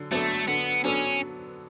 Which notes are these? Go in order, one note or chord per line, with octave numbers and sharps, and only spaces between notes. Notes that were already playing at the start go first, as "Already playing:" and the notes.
Already playing: D3 F#3
F#3 A3 B3 D4 A4
D3 B3
F#3 B3 C#4 D4 A4